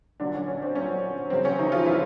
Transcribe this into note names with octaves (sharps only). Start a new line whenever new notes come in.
A#2 D3 F#3 D4
C#4
C#4
C4
A#2 F#3 C#4
E2 C#3 F#3 C4
C#4
D#3 D#4
F3 F4
C#3 E3 F#3 E4